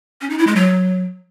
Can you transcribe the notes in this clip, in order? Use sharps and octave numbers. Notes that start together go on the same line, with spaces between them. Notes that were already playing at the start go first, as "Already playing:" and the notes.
C#4
D#4
E4
G#3
F#3